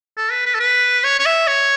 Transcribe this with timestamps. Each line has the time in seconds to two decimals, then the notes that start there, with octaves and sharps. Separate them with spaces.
0.17 A4
0.31 B4
0.46 B4
0.55 A4
0.60 B4
1.04 C#5
1.19 C#5
1.26 E5
1.47 C#5